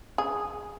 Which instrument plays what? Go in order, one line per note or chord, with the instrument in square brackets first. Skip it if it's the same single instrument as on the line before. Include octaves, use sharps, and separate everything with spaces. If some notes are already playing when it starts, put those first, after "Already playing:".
[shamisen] G#4